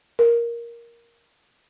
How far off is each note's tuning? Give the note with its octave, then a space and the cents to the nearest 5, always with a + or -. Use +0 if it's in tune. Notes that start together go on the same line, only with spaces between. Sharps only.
A#4 +5